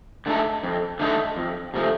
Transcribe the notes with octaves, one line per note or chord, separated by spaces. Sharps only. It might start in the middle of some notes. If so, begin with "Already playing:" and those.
D3 A3 D#4 A4
F2
D3 A3 D#4 A4
F2
C3 F3 A3